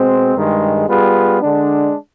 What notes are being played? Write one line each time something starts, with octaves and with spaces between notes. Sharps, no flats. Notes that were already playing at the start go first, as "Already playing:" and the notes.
Already playing: B2 G#3 C4
G2 D#3 G#3
G3 B3 F4 G#4 B4
D3 G#3 D4